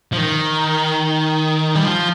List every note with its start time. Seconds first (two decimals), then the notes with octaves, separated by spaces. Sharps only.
0.13 F3
0.18 D#3
1.75 G3
1.84 F3